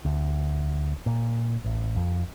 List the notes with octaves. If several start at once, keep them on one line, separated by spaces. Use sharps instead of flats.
D2
A#2
A1
F2